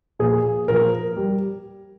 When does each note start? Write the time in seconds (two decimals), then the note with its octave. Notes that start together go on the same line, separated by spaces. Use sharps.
0.19 A#2 F3 G#4
0.68 A#2 F3 A#4
1.16 G3